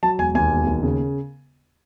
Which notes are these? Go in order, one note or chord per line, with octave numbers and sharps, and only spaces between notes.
F#3 A5
E1 G#5
D#2 G#5
E1
D#2
C#3